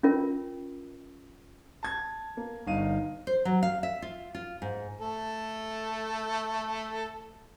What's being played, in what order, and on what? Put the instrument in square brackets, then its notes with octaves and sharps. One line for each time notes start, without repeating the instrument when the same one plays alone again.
[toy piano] C#4 F4 A#4
[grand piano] A5 G#6
A#3
G1 D#4 F5 D#7
[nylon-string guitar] C5
F#3
F5
E5
F4
F4
G#2
[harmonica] A3 A4